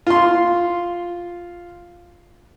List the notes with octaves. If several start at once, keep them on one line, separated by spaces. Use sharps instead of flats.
F4 C6